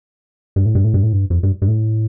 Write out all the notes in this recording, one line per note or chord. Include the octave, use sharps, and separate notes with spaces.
G2
A2
G2
A2
G2
A2
G2
F2
G2
G2
A2